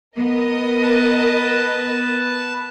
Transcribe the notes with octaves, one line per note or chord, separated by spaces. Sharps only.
B3 A#4 D#5 D#6
B4 A5